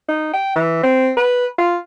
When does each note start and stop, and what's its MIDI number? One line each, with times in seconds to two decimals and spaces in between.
0.08 0.30 63
0.33 0.53 79
0.55 0.81 52
0.83 1.12 60
1.17 1.46 71
1.58 1.77 65